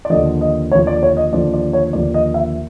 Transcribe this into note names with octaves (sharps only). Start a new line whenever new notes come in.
D5
D#2 D3 F3 D#5
D#5
D#2 D3 F3 C#5
D5
C#5
D#5
D#2 D3 F3 D5
D5
C#5
D#2 D3 F3 D5
D#5
E5